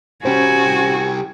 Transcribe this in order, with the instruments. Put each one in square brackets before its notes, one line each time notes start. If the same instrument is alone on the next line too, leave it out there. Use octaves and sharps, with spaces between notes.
[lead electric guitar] C2 G4 [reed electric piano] C#4 C5 [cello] F#4 [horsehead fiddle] G#5